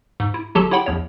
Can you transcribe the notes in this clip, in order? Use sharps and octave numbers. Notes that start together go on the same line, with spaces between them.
G#2
E4
G1 F#3 F#4 G4 A4 A5
E4 G4 C#5 F#5 G5 B5
A#1 E2 C#5